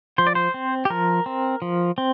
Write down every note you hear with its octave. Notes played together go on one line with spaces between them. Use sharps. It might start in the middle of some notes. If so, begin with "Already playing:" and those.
F3 C5
D5
C5
C4
G4
F3 A#4
C4
F3
C4